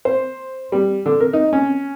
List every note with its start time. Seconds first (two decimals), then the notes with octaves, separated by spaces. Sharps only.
0.05 C5
0.72 G3
1.06 D3
1.20 A#4
1.33 D#4
1.53 C#4